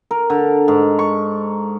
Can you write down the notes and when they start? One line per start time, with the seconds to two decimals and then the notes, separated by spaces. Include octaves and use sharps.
0.11 A#4
0.30 D3
0.68 G#2
0.99 C#6